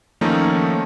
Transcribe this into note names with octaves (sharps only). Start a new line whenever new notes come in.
D#3 F3 A3 A#3 C#4 D#4